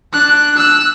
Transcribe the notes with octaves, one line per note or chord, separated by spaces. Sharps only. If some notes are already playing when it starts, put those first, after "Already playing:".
D4 F#6
E6 F#6